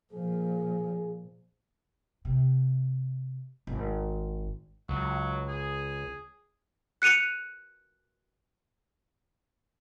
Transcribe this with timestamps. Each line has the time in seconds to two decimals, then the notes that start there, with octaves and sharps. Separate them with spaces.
0.13 A#2 F3 G#4
2.25 C3
3.67 G#1
4.89 C#2 F#3
5.48 G#4
7.02 F#6 C#7 D#7 F7